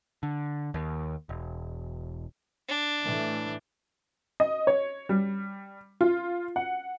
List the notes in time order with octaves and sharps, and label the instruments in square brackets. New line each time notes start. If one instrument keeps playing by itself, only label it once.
[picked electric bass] D3
D#2
E1
[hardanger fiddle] D4
[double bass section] A2 E3 A3
[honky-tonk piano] D#5
C#5
G3
F4
F#5